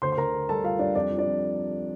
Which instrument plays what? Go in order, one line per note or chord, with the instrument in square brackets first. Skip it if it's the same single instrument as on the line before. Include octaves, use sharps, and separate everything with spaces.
[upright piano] D2 C5 C6
C6
D2 A#4 A#5
D3
G3 A4 A5
G3 F4 F5
G3 D4 D5
F2 D4 D5
F3
D4 D5
F2